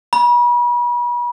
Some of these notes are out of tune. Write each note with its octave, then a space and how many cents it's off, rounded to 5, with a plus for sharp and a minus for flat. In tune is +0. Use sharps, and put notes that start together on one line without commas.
B5 -40